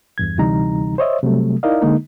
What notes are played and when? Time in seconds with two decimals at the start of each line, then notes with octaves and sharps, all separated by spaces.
0.18 E2 G2 G#6
0.38 D2 C3 E3 G3 D#4 A#5
0.98 C5 C#5 D#5 E5
1.23 C3 F#3 G3 A3
1.63 D#4 E4 A#4 D5 D#5 F5
1.82 D3 G#3 A#3 D#4